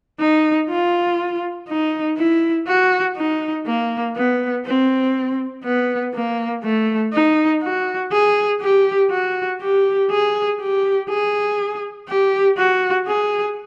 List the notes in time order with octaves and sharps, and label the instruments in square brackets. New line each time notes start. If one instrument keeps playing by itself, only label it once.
[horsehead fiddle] D#4
F4
D#4
E4
F#4
D#4
A#3
B3
C4
B3
A#3
A3
D#4
F#4
G#4
G4
F#4
G4
G#4
G4
G#4
G4
F#4
G#4